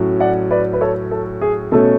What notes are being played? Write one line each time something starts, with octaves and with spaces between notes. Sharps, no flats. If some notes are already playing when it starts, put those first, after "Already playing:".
Already playing: A2 F#3 C#4
D5 F#5
B4 D5
B4
A4 C#5
A4
G#4
B2 A3 C#4 A4